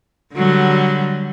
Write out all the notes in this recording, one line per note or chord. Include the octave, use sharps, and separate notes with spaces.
D3 F#3 G3